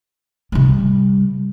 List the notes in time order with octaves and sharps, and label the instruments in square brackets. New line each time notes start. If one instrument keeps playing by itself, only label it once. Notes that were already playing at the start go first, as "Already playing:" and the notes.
[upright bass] C3 G3